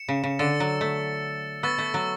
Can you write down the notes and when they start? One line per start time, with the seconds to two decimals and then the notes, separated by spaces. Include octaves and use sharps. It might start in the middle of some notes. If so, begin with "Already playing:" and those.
Already playing: C#7 E7
0.09 C#3
0.23 C#3
0.39 D3 E6 A6 C#7
0.60 F#3
0.81 A3
1.63 B3 C#6 E6 A6
1.78 A3
1.94 F#3